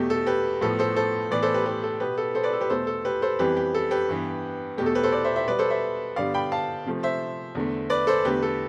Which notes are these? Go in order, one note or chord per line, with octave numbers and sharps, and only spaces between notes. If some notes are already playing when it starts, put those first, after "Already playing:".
Already playing: E2 B2 A3 G4
A4
G4 B4
A2 F3 B3 A4
A4 C5
A4 C5
A2 E3 B3 B4 D5
A4 C5
G4 B4
G4 B4
A4
B2 B3 G4 B4
A4
A4 C5
B4 D5
A4
G4 B4
E2 B2 A3 A4 C5
A4
G4 B4
A4 C5
F2 E3 G3 B3 G4 B4
G4
A4
G4 B4
G2 E3 B3
E2 B2 A3 G4
A4
G4 B4
A4 C5
B4 D5
C5 E5
C5 E5
B2 G3 B3 B4 D5
A4 C5
C5 E5
G2 D3 G3 B3 D5 F5
G5 B5
F5 A5
C3 F3 A3
C5 E5
E2 D3 A3
B4 D5
A4 C5
E2 D3 A3 G4 B4
A4